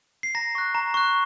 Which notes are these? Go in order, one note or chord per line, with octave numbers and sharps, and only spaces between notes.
C7
A#5 A#6
C#6 F#6
A#5
C#6 F#6